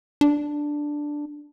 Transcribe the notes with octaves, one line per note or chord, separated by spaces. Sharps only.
D4